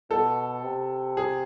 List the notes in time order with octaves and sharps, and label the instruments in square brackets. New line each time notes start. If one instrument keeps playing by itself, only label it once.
[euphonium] B2 [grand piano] A4
[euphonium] C3
[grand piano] G#4